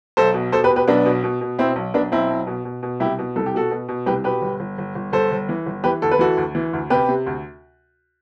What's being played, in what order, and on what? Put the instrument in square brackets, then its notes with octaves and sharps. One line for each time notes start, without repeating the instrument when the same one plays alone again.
[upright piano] B1 A4 C5
B2
B2 A4 C5
G4 B4
B2
G4 B4
B1 B3 D4
B2
B2
B2
B2 C4 E4
B1
B1 B3 D4
B1 C4 E4
B1
B2
B2
B2
C2 E4 G4
B2
C2 A4
G4
B2 F#4 A4
B2
B2
C2 G4 B4
B2 G4 B4
G1
G1
G1
G1
G1 A4 C5
G1
E3
G1
E3 G4 B4
D2 A4
B4
E3 F#4 A4
D2
E3
D2
C3 G4 B4
C3
D2